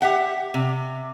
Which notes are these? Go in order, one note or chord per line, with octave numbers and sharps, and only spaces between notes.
G4 E5 F#5 G5
C3